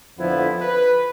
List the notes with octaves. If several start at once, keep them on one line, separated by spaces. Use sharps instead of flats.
F2 D3 F3 B3 E4
B4